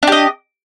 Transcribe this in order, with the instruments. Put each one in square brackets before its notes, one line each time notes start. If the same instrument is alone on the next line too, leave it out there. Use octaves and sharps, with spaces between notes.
[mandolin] D4
G4
D#5